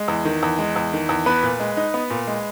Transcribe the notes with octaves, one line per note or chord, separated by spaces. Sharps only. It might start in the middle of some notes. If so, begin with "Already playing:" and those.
Already playing: G#3
E2
D#3
E2
G#3
E2
D#3
E2
B3 B4
A#2
G#3
D#4
B3
A#2
G#3